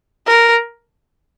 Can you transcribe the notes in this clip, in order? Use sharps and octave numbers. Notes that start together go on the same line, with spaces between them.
A#4